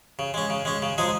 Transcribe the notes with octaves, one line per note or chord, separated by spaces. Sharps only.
C#3
G#3 C#4
C#3
G#3 C#4
C#3
F3 G#3 D#4 G#4